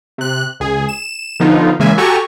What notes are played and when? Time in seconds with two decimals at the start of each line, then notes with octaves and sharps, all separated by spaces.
0.18 C3 F#6
0.60 C#2 G#4
0.89 E7
1.40 D3 F3 B3 D#4 F4
1.79 C#3 E3 G#3 A#3 E5 G#5
1.98 F#4 G4 A4 G#5 A#5 C#6